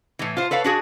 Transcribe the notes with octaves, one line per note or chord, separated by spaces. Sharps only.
A2 E3
F4 C5
A4 B4 C#5 F5
D4 F#4 G#4